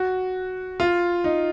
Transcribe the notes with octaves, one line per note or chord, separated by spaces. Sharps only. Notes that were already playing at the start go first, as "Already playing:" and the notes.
Already playing: F#4
F4
D#4